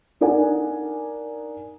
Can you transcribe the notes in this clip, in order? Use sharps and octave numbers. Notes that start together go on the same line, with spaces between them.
D4 D#4 A#4 D5 F#5 G#5